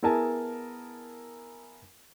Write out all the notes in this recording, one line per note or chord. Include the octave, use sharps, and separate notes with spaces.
B3 E4 G#4 A#4 G#5 A5